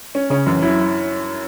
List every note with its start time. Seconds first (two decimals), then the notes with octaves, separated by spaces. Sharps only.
0.15 C#4
0.30 C#3 C#4
0.46 F#2 E3
0.62 F#3 E4